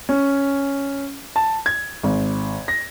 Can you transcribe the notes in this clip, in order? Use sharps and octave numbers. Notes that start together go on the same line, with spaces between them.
C#4
A5
G#6
G#1
A#6